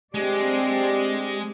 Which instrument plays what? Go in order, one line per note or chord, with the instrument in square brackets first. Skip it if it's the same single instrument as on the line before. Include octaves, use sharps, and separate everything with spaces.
[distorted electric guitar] G#3 [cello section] C4 D4 D5 [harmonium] G4